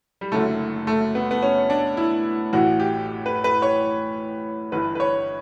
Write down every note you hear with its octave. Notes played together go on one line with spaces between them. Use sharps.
G3
F#1 F#2 D3 A3
A3
B3
B3
C#4
D4
E4
A1 A2 E3 F#4
G4
B4
B4
C#5
G1 G2 E3 B4
B4
C#5